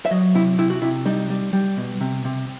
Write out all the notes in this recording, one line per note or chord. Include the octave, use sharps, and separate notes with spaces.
E5
F#3 D#5
C3 E4
C3 E4
F#4
C3 E4
G3 D#4
G3
G3
B2
C3
C3